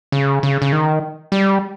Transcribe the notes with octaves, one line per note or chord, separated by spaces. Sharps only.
C#3
C#3
C#3
D#3
G3